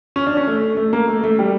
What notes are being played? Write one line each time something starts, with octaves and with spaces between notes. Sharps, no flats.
C#4
D4
C#4
A3
A3
A#3
A3
A3
G3